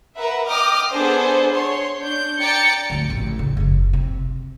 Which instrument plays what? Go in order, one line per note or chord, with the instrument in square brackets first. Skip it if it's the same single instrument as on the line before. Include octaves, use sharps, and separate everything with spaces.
[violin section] A#4 B4 E5 F#5
D#5 G5 D6 D#6 F6
B3 D4 G#4 A4 C5
C#5 C6
D4 G6
D5 G5 A5 A#5 A6 C#7
[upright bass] D2 G#2
A1
C#3
F#1 E2
C3